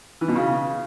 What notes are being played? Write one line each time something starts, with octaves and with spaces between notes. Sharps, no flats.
E3
B2
C#3